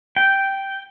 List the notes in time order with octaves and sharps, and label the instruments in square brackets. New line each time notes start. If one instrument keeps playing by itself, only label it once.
[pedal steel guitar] G5